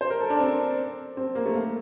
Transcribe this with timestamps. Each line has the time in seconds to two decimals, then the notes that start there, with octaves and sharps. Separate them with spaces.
0.01 C5
0.10 A#4
0.21 A4
0.30 D4
0.40 C4
1.17 C4
1.35 A#3
1.46 A3
1.55 A#3